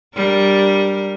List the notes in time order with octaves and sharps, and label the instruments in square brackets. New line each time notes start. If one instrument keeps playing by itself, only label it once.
[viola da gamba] G3 D4 A#4